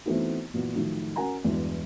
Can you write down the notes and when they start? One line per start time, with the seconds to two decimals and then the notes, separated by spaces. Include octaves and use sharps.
0.06 E3 A3 B3 C4 D#4 F#4
0.54 A#2 E3 F#3 B3
0.76 A2 D#3 F3 F#3
1.16 C#4 F#4 A#4 F#5 G#5 A#5
1.44 E2 G2 E3 F#3 G#3